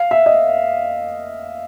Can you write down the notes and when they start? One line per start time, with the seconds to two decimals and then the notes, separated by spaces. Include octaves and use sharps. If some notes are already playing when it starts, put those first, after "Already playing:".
Already playing: F5
0.11 E5
0.26 D#5